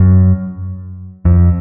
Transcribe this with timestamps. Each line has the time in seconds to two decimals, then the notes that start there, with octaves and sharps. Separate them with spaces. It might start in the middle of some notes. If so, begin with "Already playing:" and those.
Already playing: F#2
1.25 F2